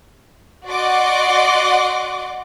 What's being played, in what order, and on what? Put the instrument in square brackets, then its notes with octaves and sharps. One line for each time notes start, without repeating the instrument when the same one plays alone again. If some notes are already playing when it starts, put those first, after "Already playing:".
[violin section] F#4 D5 D#5 F#5 C6 D6